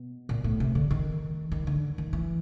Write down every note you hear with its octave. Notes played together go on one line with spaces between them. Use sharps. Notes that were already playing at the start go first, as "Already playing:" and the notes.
Already playing: B2
A#2
A2
C3
D3
D#3
D#3
D3
D#3
E3